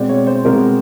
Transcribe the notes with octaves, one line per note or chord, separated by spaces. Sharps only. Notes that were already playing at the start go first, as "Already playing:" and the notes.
Already playing: B2 G#3 C4 D5
C#5
C5
B2 G#3 C4 A#4